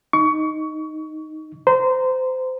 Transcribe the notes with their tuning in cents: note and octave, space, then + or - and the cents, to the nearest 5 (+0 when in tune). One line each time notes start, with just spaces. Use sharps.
D#4 +0 C#6 +25
C5 -25 A#5 +0